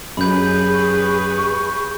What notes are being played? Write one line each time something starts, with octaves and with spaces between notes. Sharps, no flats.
F#2 G4 G#4 B4 B5 G6
C#6